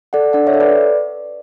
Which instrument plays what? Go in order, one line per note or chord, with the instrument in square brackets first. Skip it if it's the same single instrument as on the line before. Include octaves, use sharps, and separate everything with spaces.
[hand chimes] A4 D5 F#5
D4 D5 F#5
C#5 E5
A4
B4 D5